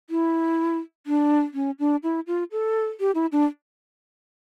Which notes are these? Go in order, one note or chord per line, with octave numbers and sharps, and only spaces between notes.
E4
D4
C#4
D4
E4
F4
A4
G4
E4
D4